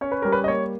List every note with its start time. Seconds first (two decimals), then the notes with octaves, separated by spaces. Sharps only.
0.01 C#4 C#5
0.12 B4
0.22 G3 A#4
0.32 B4
0.44 D#5
0.48 A#3 C#5